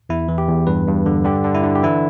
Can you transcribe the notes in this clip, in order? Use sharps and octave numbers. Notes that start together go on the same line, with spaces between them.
E2 E4
E3
G4
E2
G2 B4
G2
D3
D3 G4
D3
E4
D3
G4
E3 E4